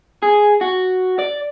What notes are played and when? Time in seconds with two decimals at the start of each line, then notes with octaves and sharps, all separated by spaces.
0.22 G#4
0.61 F#4
1.19 D5